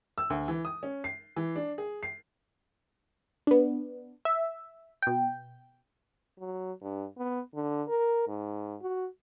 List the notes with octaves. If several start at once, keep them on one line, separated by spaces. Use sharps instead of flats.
E6
D2
E3
D#6
C#4
C7
E3
D4
G#4
C7
B3 D4
E5
B2 G5
F#3
G2
B3
D3
A#4
G#2
F#4